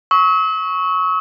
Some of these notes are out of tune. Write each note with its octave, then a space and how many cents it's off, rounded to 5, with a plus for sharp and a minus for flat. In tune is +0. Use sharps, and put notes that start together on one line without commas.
C#6 +0 E6 -45